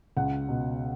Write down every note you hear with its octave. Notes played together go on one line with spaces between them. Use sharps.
C#2 F#5
B2